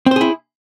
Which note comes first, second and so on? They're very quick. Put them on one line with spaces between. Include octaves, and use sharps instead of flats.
C4 C5 G#4 E4